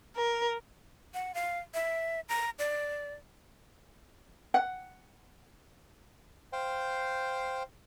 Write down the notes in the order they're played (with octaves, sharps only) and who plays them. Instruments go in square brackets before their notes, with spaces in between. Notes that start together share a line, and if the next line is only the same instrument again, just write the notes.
[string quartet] A#4
[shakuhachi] F#5
F5
E5
A#5
D5
[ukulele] F#5
[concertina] C5 F5 G5